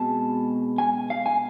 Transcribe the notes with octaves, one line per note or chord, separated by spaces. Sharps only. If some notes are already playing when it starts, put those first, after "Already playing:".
Already playing: B2 G#3 C4 A5
G#5
F5
G#5